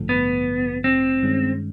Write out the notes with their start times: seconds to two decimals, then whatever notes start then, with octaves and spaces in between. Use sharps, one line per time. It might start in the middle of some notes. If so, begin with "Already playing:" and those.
Already playing: A1 G2 D3 F3 A3
0.09 B3
0.84 C4
1.22 G2 D#3 G#3 C#4